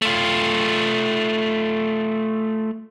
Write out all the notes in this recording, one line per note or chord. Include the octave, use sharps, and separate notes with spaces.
A3 F4